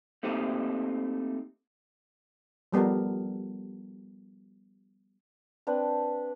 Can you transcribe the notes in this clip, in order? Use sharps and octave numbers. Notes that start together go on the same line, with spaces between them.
A3 A#3 C4 D#4 G4 C5
F3 G3 B3 A4 A#4
C4 D4 B4